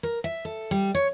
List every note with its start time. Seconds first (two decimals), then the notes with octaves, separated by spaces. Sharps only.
0.03 A#4
0.24 E5
0.45 A4
0.71 G3
0.95 C#5